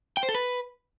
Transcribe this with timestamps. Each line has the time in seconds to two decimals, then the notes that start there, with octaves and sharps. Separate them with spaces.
0.17 G5
0.23 C5
0.29 A4
0.35 B4